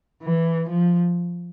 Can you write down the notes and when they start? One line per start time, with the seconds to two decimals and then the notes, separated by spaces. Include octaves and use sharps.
0.23 E3
0.69 F3